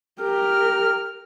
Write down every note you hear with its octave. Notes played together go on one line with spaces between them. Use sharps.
G4 A#4 F6